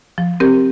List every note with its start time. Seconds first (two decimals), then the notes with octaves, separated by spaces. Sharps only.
0.18 F3
0.40 C4 G4 A#4